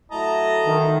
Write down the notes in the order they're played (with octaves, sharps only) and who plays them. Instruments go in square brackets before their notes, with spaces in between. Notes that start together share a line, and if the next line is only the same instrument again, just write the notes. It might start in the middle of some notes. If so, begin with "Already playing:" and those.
[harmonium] F#3 A3 E4 [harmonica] D#5 A5 A#5
[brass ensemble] D#3